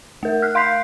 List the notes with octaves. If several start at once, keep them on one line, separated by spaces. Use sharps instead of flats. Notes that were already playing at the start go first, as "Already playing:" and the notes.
A3 A#4
F6 F#6
F5 C6 G6 B6 C7